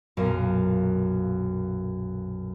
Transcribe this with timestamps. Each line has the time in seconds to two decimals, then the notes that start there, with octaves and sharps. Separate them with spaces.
0.17 B1 F#2 A#2 A#4 F5 D#7